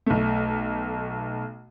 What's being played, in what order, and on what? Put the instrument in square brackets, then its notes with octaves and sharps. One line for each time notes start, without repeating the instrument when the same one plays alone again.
[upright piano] B1 A3